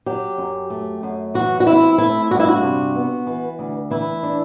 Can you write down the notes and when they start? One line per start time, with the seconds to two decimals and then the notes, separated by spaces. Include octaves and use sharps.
0.06 F#3 G4
0.38 F#2
0.70 A3
1.03 F#2
1.34 E3 F#4
1.60 F#4
1.66 C4 E4
1.98 A3 E4
2.31 G2 F#4
2.40 E4
2.48 F#4
2.63 C3
2.95 B3
3.27 E3
3.59 D2
3.91 E3 E4
4.23 D4